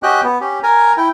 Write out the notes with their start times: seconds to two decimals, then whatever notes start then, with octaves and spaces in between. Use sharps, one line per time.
0.03 C#4 F#4 G4 D#5 G5 F#6
0.23 B3
0.41 C#4 G4
0.63 A#4 G#5 A#5
0.97 E4 G5